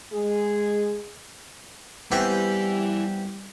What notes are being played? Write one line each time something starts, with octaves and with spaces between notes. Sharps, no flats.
G#3 G#4
E3 G3 B3 C4 E4 G4 G#5